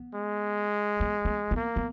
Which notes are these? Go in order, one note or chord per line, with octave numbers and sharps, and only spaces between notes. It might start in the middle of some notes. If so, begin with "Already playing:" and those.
Already playing: B3
G#3
B3
B3
B3
A#3
B3